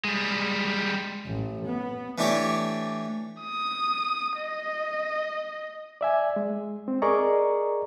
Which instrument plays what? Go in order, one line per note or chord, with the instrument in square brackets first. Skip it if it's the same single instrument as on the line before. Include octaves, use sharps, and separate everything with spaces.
[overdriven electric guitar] G3 G#3
[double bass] A1
B3
[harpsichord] E3 A3 D4 E4 G4 C#5
[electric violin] D#6
D#5
[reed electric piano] D5 E5 G#5
G#3
C4
G#4 A#4 D5 D#5 A#5 C#6